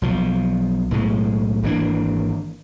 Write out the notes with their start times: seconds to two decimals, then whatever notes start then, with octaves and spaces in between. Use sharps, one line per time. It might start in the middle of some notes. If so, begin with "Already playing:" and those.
0.02 B1 F3
0.91 B1 A2 G#3
1.63 G#1 E3 A#3 D4